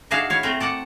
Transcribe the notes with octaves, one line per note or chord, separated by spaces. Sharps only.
D4 D#4 F#4 G#4 E5 F5
E4 C#5 F5
A3 C4 A#4 C5
A4 D5 F#5 A5